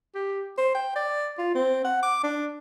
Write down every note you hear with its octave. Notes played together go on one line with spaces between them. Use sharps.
G4
C5
G5
D5
F4
C4
F#5
D6
D4